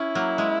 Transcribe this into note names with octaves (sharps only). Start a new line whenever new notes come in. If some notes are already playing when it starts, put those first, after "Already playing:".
Already playing: C#4 E4
F#3 A#3
G#3